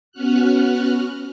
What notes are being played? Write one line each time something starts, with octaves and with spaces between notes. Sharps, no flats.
B3 C#4 F#4 F6 F#6